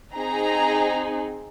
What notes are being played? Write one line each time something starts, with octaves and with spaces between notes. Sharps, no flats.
C4 D#4 G#4 A#5